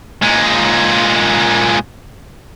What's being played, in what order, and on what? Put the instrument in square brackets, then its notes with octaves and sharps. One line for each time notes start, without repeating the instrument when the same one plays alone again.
[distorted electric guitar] A#2 G#3